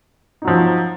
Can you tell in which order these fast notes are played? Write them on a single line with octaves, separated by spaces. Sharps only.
D#4 F#3 F3